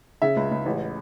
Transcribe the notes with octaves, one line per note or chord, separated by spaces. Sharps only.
C#3 E5
C#2
C#2
A1